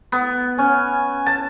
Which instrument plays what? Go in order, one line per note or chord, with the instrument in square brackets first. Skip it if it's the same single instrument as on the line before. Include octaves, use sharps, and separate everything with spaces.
[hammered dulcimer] B3
[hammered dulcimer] C#4 [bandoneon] G#5
[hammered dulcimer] A5